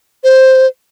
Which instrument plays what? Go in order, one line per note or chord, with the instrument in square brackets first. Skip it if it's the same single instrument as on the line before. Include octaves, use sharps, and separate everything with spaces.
[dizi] C5